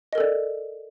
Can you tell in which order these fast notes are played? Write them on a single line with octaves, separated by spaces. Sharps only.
D#5 A#4 A4 D5